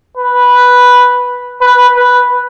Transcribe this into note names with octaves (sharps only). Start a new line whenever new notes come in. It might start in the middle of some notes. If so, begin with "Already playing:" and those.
B4
B4
B4